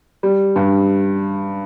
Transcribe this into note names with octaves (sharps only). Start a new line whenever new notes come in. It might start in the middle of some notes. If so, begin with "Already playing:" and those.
G3
G2